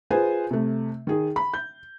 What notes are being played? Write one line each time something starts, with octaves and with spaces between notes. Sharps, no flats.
F4 G#4 B4 C5 G#5
C3 A3
D#3 G#4
B5
G6